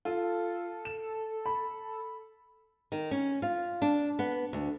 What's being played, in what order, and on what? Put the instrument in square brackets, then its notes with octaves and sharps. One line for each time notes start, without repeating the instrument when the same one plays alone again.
[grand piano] F4 [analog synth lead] A4
[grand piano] E7
B5
[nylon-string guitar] D#3
C#4
F4
D4
B3
D2